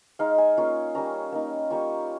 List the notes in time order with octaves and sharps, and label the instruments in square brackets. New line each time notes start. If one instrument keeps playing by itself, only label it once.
[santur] G#3 D#4 F5
G#5
A#3 C#4 F4
G3 A#3 C#4 A#5
A#3 D#4
G3 A#3 C#4 F4 C#6